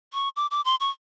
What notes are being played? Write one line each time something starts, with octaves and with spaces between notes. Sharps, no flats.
C#6
D6
D6
C6
C#6